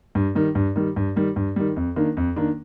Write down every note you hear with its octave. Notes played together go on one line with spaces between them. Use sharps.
G2
D#3 G3
G2
D#3 G3
G2
D#3 G3
G2
D#3 G3
F2
D#3 A#3 D4
F2
D#3 A#3 D4